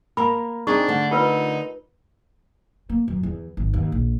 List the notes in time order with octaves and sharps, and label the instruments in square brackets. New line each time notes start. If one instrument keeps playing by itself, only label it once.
[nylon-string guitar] A#3 A#4 [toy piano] B5
[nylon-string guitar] C4 D#4 G#4 [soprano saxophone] D4 [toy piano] C#6
[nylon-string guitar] D3 A3
[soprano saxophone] D#4 [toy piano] F4 A#4 B4
[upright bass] A#3
F#2
E2
G#1
D#2
A#1